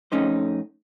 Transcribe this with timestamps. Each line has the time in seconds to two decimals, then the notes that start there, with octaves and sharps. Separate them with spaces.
0.12 F2 A3 C#4 D#4 C5